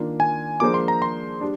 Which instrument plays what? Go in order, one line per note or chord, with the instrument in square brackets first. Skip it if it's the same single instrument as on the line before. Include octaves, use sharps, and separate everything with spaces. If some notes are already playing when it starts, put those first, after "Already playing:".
Already playing: [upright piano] D#3 A#3 D4 F4
[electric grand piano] G#5
[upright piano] F3 A#3 D4 G#4 C5 [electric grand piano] D6
[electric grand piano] C6
A#5
C6
[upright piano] G3 D4